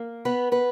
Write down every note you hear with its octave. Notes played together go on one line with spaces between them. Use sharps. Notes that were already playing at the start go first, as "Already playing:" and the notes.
Already playing: A#3
B3 B4
B3 B4